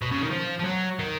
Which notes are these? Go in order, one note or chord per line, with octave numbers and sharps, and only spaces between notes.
B2
C#3
D#3
F3
F3
F#3
D#3